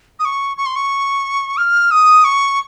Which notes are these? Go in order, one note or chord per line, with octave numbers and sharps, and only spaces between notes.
D#6
C#6
C#6
C6
C#6
F6
D#6
C#6